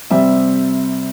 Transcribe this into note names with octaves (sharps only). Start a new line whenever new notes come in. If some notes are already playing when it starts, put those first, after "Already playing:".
C3 G3 C4 E5